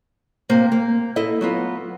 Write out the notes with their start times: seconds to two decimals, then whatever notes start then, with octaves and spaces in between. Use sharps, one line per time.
0.49 C3 A#3 A#4 C5
0.72 A#3
1.16 E4 A4 D#5
1.41 F#3 B3 F4